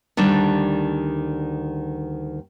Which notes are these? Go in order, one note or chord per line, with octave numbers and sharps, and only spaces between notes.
D2 D#3 G3 D4